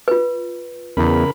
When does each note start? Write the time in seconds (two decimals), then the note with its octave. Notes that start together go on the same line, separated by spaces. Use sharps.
0.08 F4 B4
0.97 E2 C#3 A#4 B5